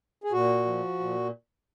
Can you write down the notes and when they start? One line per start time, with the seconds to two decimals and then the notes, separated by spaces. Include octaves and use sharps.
0.24 G#4
0.32 A#2 F#4
0.66 F3
1.00 A#2